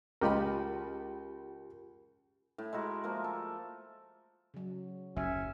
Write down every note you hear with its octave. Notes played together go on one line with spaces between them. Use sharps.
C#2 F4 G4 A#4 D#5 B5
A2
G#3 E4 F#4 A#4
F3 A3 A#3
A4
C#3 F#3
F#1 D#2 C#4 E5